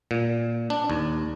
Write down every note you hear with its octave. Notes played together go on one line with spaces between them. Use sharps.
A#2
D4
D#2